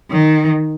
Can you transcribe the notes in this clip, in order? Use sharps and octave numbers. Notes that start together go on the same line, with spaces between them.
D#3